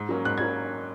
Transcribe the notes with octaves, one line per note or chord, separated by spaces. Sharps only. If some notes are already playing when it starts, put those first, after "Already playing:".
Already playing: G#2
F#3 A#3 C#4
G#2 F#6
F#3 A#3 C#4 G#6